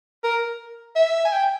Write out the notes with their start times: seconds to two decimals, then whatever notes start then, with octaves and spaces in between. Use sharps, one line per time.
0.24 A#4
0.96 E5
1.25 G#5
1.32 G5